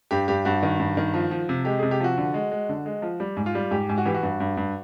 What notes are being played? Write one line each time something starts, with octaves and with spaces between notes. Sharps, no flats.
G2 G4
G2 G4
G2 F#4
D#3
G2
D#3
F3
F3
C3
G#3 G4
C3 G#4
G4
F3 F#4
D3
G#3
G#3
D3
G#3
F3
G3
G#2
F4
G3
G#2 G4
G#2
F#4
E3 G4
F#4
G2
G2
G2